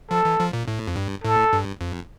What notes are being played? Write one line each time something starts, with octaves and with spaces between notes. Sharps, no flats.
F3 A4
E3
F3
A#2
A2
F2
G2
A2 A4
G2
F2